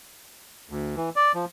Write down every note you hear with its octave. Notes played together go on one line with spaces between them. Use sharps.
D2
E3
D5
F3